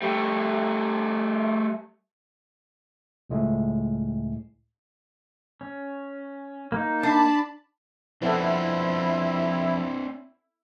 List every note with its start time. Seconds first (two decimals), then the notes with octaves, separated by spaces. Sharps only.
0.02 G3 A3
3.30 C#2 A2 G#3 A3
5.61 C#4
6.72 A#3 D#4
7.03 D4 A5 B5
8.22 F2 B3 C4 D4 E4 A4 F#5